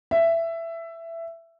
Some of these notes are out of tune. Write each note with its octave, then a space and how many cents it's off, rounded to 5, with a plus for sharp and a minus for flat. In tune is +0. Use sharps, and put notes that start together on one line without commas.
E5 +15